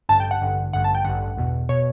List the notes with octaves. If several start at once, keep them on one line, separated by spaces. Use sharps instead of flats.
A1 G2 D3 A5
G5
F#5
A1 G2 D3
A1 G2 D3 F#5
A5
G5
A1 G2 D3 F#5
E2 B2
B2 C#5